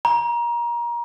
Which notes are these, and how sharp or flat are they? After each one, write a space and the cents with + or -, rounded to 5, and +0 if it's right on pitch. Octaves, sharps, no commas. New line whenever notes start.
A#5 +25